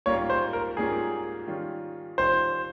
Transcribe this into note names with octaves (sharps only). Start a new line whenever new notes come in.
G#2 G3 A#3 C#4 F4 C#5
C5
A#4
G#2 G3 A#3 C#4 F4 G#4
D#3 G3 C#4 F4
D#3 G3 C#4 F4 C5